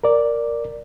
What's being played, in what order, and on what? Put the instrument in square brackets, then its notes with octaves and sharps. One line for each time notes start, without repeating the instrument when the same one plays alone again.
[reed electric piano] A#4 D5